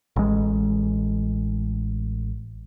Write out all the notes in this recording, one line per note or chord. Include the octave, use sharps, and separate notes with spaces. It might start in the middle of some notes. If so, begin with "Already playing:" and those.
A1 G#3